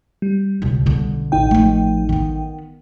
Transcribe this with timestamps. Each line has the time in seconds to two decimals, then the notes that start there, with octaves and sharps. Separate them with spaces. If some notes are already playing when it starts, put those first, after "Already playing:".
0.22 G3
0.62 C#2 B2
0.86 B1 D3
1.32 A1 D#4 G5
1.51 F3 A3
2.09 D#3 B3